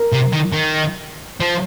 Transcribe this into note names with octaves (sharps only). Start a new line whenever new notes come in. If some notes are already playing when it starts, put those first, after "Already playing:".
Already playing: A#4
C3
D#3
D#3
F3